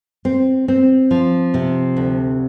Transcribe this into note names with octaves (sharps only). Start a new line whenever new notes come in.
C4
C4
F3
C3
D2